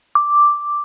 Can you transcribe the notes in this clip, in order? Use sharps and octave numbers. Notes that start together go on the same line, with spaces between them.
D6